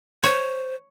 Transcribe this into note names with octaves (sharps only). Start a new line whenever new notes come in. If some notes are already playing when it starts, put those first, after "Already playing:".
C5 C#5